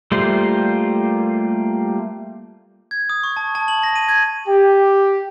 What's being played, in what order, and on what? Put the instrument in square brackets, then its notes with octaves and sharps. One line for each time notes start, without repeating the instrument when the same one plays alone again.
[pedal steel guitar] G3 A3 A#3 F4 C5
[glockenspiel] G#6
D#6
C#6
A5
A5
F#7
A#6
D#7
G#6
[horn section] G4